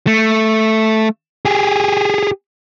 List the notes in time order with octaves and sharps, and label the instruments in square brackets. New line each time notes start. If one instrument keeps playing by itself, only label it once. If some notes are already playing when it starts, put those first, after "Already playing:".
[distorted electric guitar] A3
G4 G#4